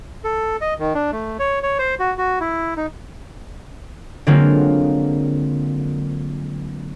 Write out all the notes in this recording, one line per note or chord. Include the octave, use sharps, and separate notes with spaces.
A4
D#5
D#3
D4
A3
C#5
C#5
C5
F#4
F#4
E4
D#4
D3 F#3 G#3 A#3 C4 F4